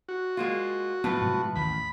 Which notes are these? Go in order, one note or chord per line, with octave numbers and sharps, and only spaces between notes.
F#4
G#3 A#3 F4
A2 F#3 B3 F4 B4
G#2 C3 F#3
A1 D#2 D#3 B5